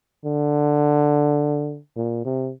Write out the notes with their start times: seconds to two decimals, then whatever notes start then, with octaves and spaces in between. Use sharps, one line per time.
0.25 D3
1.96 A#2
2.25 C3